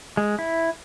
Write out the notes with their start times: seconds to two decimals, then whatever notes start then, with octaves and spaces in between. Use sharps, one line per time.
0.17 G#3
0.39 E4